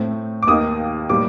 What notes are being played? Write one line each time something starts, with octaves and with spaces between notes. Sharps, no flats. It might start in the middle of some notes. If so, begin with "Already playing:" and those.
Already playing: A2 A3 C4
D6
D#2 D#3 A#3 D#4 D#6
A2 G3 A#3 D6